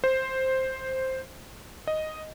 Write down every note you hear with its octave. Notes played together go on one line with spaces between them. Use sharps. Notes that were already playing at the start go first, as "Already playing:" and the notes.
C5
D#5